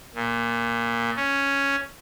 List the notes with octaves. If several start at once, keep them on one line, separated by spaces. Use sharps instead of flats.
A#2
C#4